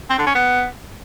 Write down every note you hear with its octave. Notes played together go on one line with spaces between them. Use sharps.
C4
D3
C#4
B3